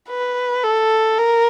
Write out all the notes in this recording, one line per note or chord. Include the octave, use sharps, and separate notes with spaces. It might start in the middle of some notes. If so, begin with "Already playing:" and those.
B4
A4
A#4